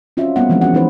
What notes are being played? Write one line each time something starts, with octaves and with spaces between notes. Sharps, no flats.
C4 C#4 F4 F#4 D#5 E5
G3 A#3 B3 F#5
E3 F3 G#3 C4 D4
C#4 F#4 F#5
E3 D#4 E4 B4 C5